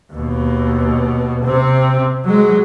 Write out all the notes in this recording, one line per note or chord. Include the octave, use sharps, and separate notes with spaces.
D#2 B2
C3 C4
F#3 G#3